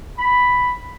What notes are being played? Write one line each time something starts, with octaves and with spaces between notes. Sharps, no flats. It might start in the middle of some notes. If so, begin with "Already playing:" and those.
B5